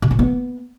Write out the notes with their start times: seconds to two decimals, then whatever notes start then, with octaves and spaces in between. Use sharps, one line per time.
0.02 B2
0.11 A#2
0.19 B3